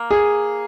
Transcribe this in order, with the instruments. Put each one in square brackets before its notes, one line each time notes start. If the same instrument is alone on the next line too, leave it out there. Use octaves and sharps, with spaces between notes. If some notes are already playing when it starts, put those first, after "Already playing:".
Already playing: [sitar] A#3
[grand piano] G#4